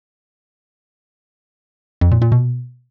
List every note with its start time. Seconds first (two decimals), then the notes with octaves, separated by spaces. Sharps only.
2.01 F2
2.11 A#2
2.22 A#2
2.32 B2